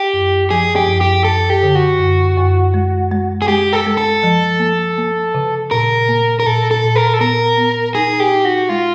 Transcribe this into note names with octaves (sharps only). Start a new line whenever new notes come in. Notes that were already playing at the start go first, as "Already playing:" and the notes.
Already playing: G4
F#2
F3 G#4
G4
F#2
G4
F#2 A4
G4
D3
F#4
F#2
F#2
G#3
G#3
G#4
G#3 G4
A4
G#3
A4
F3
A#3
A#3
C#3
A#2 A#4
A#3
A#4
A#2 A4
A4
A#2
A#4
A4
B3 A#4
B3
D#4 G#4
G4
D#4
F#4
G#3 F4